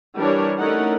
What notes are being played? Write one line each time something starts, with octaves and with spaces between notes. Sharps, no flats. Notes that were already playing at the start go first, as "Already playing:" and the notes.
E3 G3 D4 A#4 C#5
A3 C#4 D#4 E4 A#4 F#5